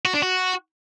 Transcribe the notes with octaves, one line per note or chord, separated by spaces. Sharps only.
F#4
D4
F#4